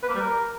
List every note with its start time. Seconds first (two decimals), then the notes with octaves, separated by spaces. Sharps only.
0.03 B4
0.09 A#3
0.14 G3
0.20 A#4